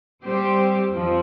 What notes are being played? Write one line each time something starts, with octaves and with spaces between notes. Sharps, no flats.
G3 C4 G4 C5
F2 F3 C4